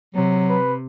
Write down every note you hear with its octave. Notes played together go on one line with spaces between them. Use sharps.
C3 F#3
B4